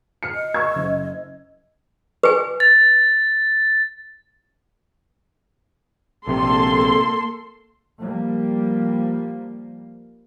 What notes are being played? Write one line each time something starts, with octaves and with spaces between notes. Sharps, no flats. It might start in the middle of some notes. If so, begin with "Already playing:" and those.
F6 C7 C#7
D#5
C#6 E6 G#6
F#1
B4 G#5
A6
A#1 C3 A#3 A4 C6
F3 G3 A#3